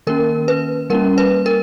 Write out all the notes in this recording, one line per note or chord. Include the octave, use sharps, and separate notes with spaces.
D#3 A#3 C#4 A#4
B4
G3 A#3 C#4 A#4
B4
A#4